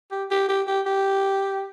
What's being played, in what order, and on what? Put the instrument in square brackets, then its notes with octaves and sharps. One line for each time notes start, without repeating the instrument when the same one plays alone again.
[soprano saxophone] G4
G4
G4
G4
G4